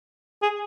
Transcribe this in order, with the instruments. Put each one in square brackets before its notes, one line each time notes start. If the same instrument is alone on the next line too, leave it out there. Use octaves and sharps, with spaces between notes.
[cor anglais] G#4